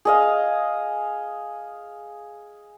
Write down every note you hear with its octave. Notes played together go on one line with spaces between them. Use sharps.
G#4 D#5 F5